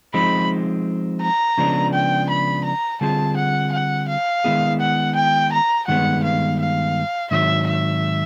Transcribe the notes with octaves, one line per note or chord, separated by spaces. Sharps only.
F3 G#3 C4 D#4 B5
A#5
C#3 F3 G#3 B3 D4
G5
B5
A#5
D3 G3 C4 F4 G#4 A5
F#5
F#5
F5
D#3 G#3 B3 E4 G#4
F#5
G5
A#5
G2 D#3 G#3 B3 F#5
F5
F5
G#2 D#3 F#3 E5
E5